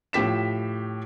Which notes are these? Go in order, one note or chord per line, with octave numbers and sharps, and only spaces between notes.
A2 F3 G4 B6 E7